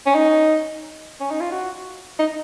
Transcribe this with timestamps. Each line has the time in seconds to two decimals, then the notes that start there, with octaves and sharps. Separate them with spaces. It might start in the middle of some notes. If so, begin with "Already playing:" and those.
0.06 C#4
0.14 D#4
1.20 C#4
1.30 D#4
1.40 F4
1.51 F#4
2.19 D#4